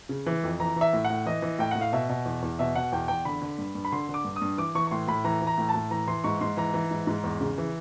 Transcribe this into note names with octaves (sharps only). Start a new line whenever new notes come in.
C#3
E3
F2
E3 A#5
E3
E5
A2
F#5
A2
E3 D#5
E3
A2 G5
A2 F#5
F5
B2 E5
B2
E2
E2
B2 E5
B2 F#5
E2 G5
E2 G5
D3 B5
D3
G2
G2
B5
D3 C6
D3
D6
G2
D#6
G2
E3 D6
E3 C#6
C#6
A2 C6
A2 B5
E3 A#5
E3
A#5
A2
A5
A2
E3 A#5
E3 C6
G#2 C#6
G#2 C6
E3 A#5
E3
G#2
G#2
E2
C#3
E3